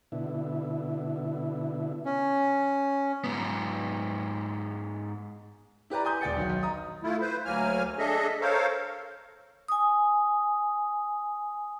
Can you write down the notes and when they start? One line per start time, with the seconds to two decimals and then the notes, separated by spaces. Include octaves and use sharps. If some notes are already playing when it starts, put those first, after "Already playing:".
0.12 B2 D3 E4
2.05 C#4
3.24 G#2 B3
5.90 E4 G4 B4 D5 A#5
6.05 G#5 A#5 C6 D#6 G6
6.21 E1 D5 G5 A6 C#7
6.37 B1 D#3 F#4
6.50 B1
6.63 A#5 D#6
7.03 A3 E4 F4
7.21 B4 C5
7.45 D2 F#3 A#3 G#5 F6
7.99 D4 G#4 A4 D#5 E5
8.41 A4 A#4 C5 C#5 F5
9.68 G#5 D#6